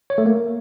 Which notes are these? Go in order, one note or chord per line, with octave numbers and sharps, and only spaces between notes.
C#5
A3
A#3